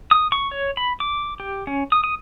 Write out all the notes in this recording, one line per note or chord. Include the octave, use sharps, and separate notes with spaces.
D#6
C#6
C#5
B5
D6
G4
C#4
D#6
D#6